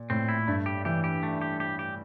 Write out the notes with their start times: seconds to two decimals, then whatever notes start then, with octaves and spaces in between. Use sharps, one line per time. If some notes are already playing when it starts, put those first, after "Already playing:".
Already playing: A#2
0.10 A2 C4
0.29 E4
0.47 G2 A3
0.66 G4
0.85 E3 G4
1.04 G4
1.23 A3
1.41 G4
1.60 G4
1.79 G4